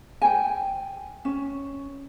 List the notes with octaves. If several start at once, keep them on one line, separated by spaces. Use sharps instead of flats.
G5 G#5
C#4